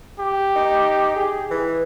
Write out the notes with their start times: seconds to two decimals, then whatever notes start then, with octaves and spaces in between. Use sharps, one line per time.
0.20 G4
0.56 D#4
1.16 G#4
1.51 E3